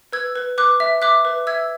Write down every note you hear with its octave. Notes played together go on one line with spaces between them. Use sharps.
B4 E6 G#6
B4
B4 D6 F#6
E5
E5 D6 F#6
B4
E5 E6 G#6